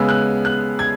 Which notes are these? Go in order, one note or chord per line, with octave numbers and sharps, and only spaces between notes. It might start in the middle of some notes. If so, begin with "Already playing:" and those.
Already playing: C#3 G#3 B3 E6
F#6
F#6
G#6